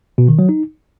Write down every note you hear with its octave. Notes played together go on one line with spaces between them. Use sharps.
B2
D#3
F#3
D#4